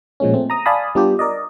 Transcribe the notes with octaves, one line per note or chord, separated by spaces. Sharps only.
A#2 F3 G#3 A#3 C#4
A3 C4
A#5 D#6
D5 F5 G#5 A5 B5 D#6
G3 B3 D4 F4 G4
A#4 D5 D#5